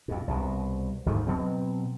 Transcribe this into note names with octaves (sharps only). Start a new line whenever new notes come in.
F2 B2
C2 B2
D2 G#2 D3 D#3
B2 F#3 C4